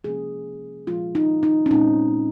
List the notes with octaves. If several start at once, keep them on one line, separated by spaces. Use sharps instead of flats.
C3 F3 A#3 C#4 G#4
A#2 F3 G#3 F4
D#4
D#4
C#4
A#2 G#3 C4 D#4